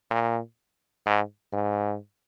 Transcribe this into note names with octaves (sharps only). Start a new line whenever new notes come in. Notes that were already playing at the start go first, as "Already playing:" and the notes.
A#2
G#2
G#2